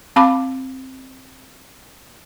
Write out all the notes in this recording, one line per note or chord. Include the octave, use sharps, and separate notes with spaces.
C4 F5 A5 B5 D6